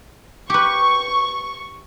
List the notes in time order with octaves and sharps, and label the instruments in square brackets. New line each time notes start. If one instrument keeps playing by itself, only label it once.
[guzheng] G4 B4 [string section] C#6